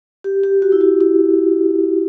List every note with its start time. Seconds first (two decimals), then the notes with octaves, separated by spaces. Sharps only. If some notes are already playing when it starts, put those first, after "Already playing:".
0.24 G4
0.43 G4
0.62 F#4
0.72 E4
0.81 F#4
1.01 E4